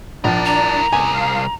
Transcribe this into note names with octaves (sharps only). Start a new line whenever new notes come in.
A#1 D4 E4 A#4 D5
A#5
C2 G#5
F5